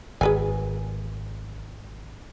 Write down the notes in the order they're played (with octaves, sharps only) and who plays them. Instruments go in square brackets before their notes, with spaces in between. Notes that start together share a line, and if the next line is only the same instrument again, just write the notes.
[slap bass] G#1 [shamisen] G#4 B4 G#5